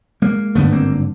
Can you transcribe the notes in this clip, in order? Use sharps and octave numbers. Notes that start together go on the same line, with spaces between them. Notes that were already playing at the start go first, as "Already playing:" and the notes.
G#3 A#3
G#1 G2 D3 A3 B3
A#3 C4